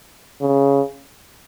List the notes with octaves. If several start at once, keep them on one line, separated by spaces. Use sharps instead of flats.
C#3